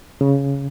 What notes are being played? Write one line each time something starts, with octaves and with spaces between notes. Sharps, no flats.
C#3